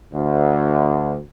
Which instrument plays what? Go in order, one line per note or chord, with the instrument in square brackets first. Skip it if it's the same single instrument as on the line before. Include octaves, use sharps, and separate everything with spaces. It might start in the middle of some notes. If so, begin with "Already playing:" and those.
[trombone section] D2